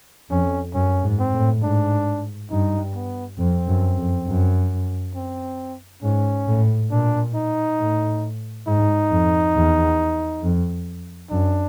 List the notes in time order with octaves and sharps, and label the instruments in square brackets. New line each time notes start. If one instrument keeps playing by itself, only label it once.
[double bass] F2 [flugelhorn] C#4
[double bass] F#2 [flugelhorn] C#4
[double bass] G#2
[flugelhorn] C4
[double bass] A2
[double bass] G#2 [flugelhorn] D4
[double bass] G2 [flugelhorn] D#4
[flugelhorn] B3
[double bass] F2 [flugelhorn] C4
[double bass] F#2
F2
F#2
[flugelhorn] C4
[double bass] G#2 [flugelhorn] C#4
[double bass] A2
[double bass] A#2 [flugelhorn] D4
[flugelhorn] D#4
[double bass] A2
[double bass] G#2 [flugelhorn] D#4
[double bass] F2
E2
F2
[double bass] F#2 [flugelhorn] D4